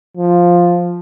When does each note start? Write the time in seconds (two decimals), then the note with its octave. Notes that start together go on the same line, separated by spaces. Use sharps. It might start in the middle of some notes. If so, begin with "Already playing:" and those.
0.17 F3